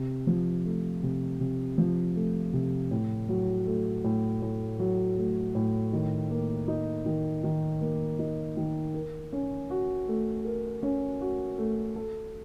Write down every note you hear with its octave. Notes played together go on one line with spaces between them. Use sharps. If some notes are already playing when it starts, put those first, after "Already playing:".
Already playing: C3
F3
A3
C3
C3
F3
A3
C3
A2
F#3
A3
A2
A2
F#3
A3
A2
D#3
A#3
D#4
D#3
D#3
A#3
D#4
D#3
A#4
C#4
F#4
A3
A#4
C#4
F#4
A3
A4